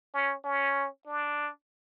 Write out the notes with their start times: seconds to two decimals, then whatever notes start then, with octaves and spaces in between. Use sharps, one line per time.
0.14 C#4
0.44 C#4
1.07 D4